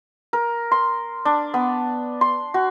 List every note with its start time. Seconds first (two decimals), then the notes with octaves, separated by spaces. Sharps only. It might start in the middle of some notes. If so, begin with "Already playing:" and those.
0.33 A#4
0.71 C6
1.25 D4
1.54 B3
2.21 C6
2.54 F#4